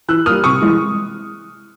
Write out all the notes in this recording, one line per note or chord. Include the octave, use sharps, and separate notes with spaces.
E3 E6 F#6
G3 A#3 D#6 F6
C3 C#6 D#6
E3 G#3